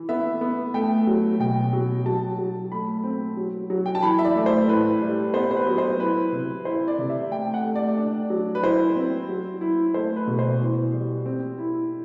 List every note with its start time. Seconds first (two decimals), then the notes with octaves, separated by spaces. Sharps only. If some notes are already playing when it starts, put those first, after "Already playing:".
Already playing: E3
0.09 B3 E5
0.41 B3
0.74 A3 G5
1.07 F#3
1.40 B2 G5
1.73 F#3
2.06 F#3 A5
2.38 F#3
2.72 A3 B5
3.04 C4
3.37 F#3
3.70 F#3
3.86 G5
3.95 A5
4.02 E3 B5
4.19 E5
4.25 D5
4.36 A3
4.46 C5
4.68 A2 B4
5.01 G3
5.34 B3 C5
5.51 C5
5.56 B4
5.67 F#3
5.78 C5
6.00 E4 B4
6.33 C3
6.65 E4 C5
6.88 D5
6.99 C3
7.10 E5
7.31 A3 G5
7.54 F#5
7.64 A3
7.75 D5
7.98 D4
8.30 F#3
8.55 B4
8.63 E4 C5
8.96 C4
9.29 F#3
9.61 E4
9.94 A3 C5
10.16 B4
10.27 B2
10.39 C5
10.60 E3
10.93 G3
11.26 C4
11.58 E4